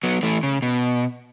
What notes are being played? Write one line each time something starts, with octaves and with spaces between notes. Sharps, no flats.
F#3 B3
E3 A3
C#3
B2